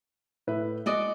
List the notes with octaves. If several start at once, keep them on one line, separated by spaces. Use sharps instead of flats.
A2 B4 E5
G#3 F#4 D5 D#5